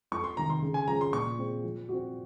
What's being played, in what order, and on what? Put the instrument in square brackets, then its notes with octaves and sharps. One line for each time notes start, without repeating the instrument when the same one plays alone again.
[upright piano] F2 [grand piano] C#6
[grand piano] C6
[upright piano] C3 D#3 [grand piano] A#5
[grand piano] C6
[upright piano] C#3
[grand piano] G#5
[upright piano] F3 G#3 C#4 [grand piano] A#5
[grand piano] C6
[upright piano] A#2 [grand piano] C#6
[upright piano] G#3 C4
F3
C4 F#4